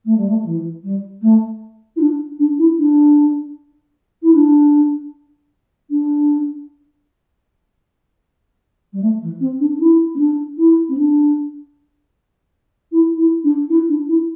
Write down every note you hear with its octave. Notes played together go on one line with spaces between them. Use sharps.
A3
G3
A3
E3
G3
A3
E4
D4
D4
E4
D4
E4
D4
D4
G3
A3
E3
C4
D4
D4
E4
C4
D4
E4
C4
D4
E4
E4
D4
E4
D4
E4